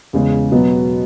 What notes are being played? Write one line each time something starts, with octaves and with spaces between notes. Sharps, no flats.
E2 C#3 G#3
B2 F#3 B3